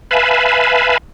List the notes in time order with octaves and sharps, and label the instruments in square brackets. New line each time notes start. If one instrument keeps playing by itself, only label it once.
[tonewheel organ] B4 E5 F5 G#5 A5 B5